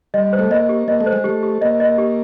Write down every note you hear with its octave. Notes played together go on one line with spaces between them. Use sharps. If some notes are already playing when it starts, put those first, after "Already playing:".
G3 D#5
C5
A3
A#3 D#5
G4
A#3 D#5
A3
C5
G#3
A3 G4
G4
A#3 D#5
D#5
G4